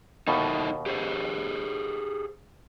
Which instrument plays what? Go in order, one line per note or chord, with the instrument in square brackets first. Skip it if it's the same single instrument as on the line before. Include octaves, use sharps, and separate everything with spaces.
[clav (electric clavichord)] D#2 B2 [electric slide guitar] D#4 E4 A4
[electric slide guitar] G4 G#4 C5